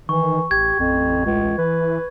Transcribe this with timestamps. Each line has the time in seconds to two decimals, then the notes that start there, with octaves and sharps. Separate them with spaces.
0.09 D#3 E3 C#6
0.51 A1 G4 G#6
0.79 A1 F2
1.25 C#2
1.58 E3 B4